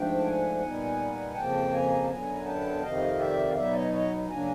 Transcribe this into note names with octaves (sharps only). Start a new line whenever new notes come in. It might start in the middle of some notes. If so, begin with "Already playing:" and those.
Already playing: G#2 F3 A3 D4 G5
A5
F#5 G#5
A#2 G3 B3 D#4
F2 C#3 F3 A#3 G5 A5
G#5 A#5
A5
F#2 D3 F#3 B3 G#5 A#5
G5 A5
F2 C3 D#3 D#5 F5
D5 E5
F5
B2 F#3 B3 D#4 D5 E5
C#5 D#5
C#5 D#5
C#3 F#3 A#3 D4 G#5 A#5